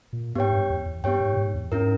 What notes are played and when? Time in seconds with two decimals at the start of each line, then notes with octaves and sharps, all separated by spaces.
0.13 A#2
0.35 G#2 B3 G4 C#5 G5
0.53 G2
0.70 E2
0.86 E2
1.04 G2 B3 G4 C#5 G5
1.20 G#2
1.33 A#2
1.37 G#2
1.54 E2
1.71 G#2 C#4 E4 A#4